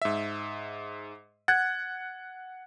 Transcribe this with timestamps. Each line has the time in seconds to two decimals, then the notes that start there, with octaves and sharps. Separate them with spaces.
0.02 G#2 E5
1.48 F#5 F#6 G#6 A6